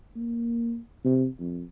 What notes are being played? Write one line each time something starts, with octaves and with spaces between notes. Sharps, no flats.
A#3
C3
F2